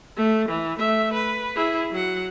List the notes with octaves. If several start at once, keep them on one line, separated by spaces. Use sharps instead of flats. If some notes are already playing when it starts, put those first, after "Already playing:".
A3
E3
A3 E5
B4
E4 G#4
F#3 F#5